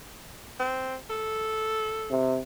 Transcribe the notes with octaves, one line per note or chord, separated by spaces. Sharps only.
C4
A4
C3